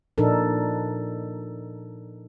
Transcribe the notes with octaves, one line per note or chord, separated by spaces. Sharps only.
A#2 F3 D4 D#4 A4 A#4